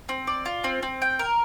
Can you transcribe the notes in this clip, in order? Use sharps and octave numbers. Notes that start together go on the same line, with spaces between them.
C4
D5
F4
C4
C4
G5
A#4